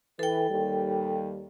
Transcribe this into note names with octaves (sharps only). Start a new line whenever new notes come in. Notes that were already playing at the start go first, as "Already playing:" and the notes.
E3 A4 B4 G5
D#2 G3